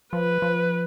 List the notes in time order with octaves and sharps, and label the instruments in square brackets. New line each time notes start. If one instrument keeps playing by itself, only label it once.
[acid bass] F3 [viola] B4
[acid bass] F3